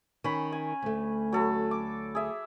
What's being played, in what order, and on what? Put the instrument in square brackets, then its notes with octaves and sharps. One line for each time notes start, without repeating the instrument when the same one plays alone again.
[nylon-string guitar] D#3 [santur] C#4 B5
[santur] G#5
[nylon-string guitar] D2 A3
[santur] F#3 A4 B5
D6
G#4 E5